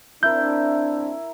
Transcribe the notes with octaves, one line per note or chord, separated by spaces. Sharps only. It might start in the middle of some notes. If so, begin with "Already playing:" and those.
C4 D4 E4 A#4 G6